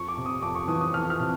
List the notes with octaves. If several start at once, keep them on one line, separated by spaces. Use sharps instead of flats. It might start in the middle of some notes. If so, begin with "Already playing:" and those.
Already playing: F2 C#6
D6
C3
D#6
F2 D6
C#6
E3 D#6
D#6
F2 F6
F6
C3